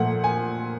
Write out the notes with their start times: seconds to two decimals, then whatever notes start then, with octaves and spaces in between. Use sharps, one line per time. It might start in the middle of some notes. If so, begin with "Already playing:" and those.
Already playing: A#2 F3 A3 F#5
0.24 G#5